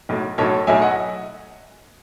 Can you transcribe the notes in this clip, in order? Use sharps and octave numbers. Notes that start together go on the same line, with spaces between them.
B1 A2 F#3
B1 A2 F#3 A4 C#5
B1 A2 F#3 E5 G#5
D#5 F#5